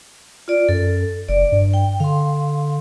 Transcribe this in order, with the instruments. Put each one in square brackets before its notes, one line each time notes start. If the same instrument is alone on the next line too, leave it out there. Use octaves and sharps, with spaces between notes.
[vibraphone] F4 D5
[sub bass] F#2 [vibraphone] A4
[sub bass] F#1 [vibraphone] D5
[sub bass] G2
[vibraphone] G5
[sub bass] D3 [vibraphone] F5 C6